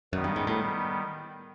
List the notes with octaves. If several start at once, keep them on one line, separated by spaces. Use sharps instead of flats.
F#2 D#3 G3 B3
G2
G#2
A2